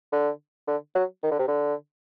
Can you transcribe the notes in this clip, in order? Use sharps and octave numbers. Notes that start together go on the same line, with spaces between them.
D3
D3
F#3
D#3
D3
C3
D3